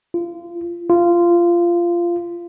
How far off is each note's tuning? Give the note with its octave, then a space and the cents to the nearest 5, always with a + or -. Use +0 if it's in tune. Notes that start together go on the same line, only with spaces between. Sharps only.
F4 -25
F4 -15